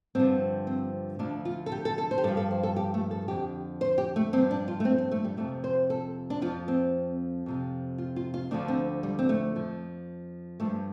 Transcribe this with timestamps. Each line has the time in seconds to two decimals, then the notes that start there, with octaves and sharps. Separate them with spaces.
0.15 G2 D3 F3 C4
0.67 C4
1.19 D2 D3 F3 D4
1.45 F4
1.66 A4
1.72 G4
1.85 A4
1.98 A4
2.11 C5
2.18 G4
2.24 G2 F3 A4
2.37 A4
2.51 C5
2.63 A4
2.76 G4
2.94 A3
3.11 A4
3.28 F2 D3 F3 G4
3.81 C5
3.98 G4
4.16 A3
4.33 G2 C4
4.37 F3
4.51 D4
4.68 F4
4.80 A3
4.85 C4
4.98 C4
5.11 A3
5.24 G3
5.37 F2 C3 F3 A3
5.64 C5
5.90 A4
6.30 D4
6.42 F3 F4
6.45 F2
6.68 C4
7.46 F2 C3 F3
7.98 F4
8.16 F4
8.34 F4
8.51 D2 D3 F3 D4
8.68 C4
9.03 G3
9.19 C4
9.29 A3
9.55 F2 F3
10.60 G2 F3 A3